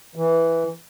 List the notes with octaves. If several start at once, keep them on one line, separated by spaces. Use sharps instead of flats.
E3